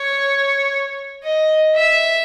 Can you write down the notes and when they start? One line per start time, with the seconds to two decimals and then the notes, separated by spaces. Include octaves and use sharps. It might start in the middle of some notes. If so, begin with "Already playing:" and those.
Already playing: C#5
1.23 D#5
1.75 E5